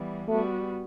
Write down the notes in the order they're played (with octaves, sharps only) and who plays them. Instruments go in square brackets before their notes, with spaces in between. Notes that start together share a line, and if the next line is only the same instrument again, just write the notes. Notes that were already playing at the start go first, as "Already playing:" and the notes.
Already playing: [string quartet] E3 G3 B3
[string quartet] G3 B3 F#4 [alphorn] A3